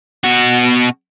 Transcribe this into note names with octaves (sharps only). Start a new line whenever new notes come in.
B2 F#4